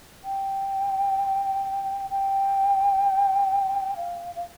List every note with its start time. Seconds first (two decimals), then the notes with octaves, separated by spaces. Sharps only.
0.24 G5
2.10 G5
3.96 F5
4.35 F5